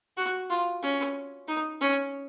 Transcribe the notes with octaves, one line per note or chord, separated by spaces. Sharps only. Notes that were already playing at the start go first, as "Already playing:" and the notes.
F#4
F4
C#4
D#4
C#4